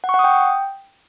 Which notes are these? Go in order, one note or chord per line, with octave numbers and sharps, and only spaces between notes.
F#5
C#6
F#5
D#6
G5